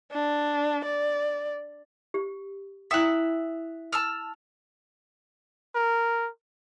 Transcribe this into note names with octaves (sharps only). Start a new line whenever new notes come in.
D4
D5
G4
E4 E5 G5 D#6 F#6
A5 E6 F6
A#4